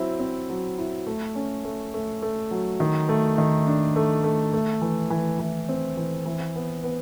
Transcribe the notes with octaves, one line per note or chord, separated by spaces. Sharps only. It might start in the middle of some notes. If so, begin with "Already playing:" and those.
Already playing: F#3 C4 E4
C4
F#3
E4
A3
C#4
A3
A3
A3
F#3
D#3
A3
D#3
D4
A3
A3
A3
E3
E3
E3
C4
E3
E3
B3
B3